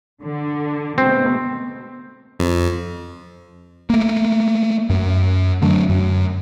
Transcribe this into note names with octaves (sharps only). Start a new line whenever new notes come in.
D3
B2 G#3 A3 C4
F2
A3 A#3
F#2
D3 F#3 A3 D4
F#2